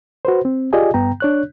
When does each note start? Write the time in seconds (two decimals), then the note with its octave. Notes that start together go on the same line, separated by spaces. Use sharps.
0.25 F#4 B4 C5
0.45 C4
0.73 F4 G4 G#4 D5 D#5 G#5
0.94 G2 B3 G5 A#5
1.20 D4 C#5 F#6